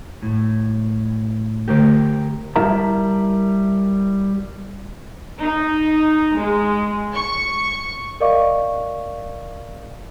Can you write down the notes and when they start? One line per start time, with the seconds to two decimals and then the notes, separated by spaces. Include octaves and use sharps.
0.23 A2
1.68 D3 A3 G4 A#4
2.56 G3 E4 A#4 E5 A5 A#5
5.42 D#4
6.36 G#3
7.16 C#6
8.20 A#4 D5 D#5 F5 C#6 D6